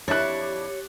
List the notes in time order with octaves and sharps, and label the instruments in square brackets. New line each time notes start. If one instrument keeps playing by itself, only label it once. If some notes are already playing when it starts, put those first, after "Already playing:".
[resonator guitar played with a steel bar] F2 D4 E4 [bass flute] G4 [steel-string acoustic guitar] C#5 [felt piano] F#6 A6